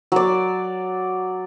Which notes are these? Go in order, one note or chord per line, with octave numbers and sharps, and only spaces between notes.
F#3 D5